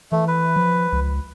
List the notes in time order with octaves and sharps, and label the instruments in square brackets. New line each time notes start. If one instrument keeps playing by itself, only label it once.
[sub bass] E3 [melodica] A3
[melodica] B4
[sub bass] F3
C#2